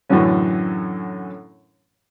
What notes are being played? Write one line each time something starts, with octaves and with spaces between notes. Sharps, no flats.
F#2 A2 D3 E3 F#3 C#4